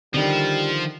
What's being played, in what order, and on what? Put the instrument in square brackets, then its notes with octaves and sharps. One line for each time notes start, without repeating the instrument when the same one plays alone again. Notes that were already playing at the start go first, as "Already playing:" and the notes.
[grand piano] D3 D#3 [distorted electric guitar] F3 [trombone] G3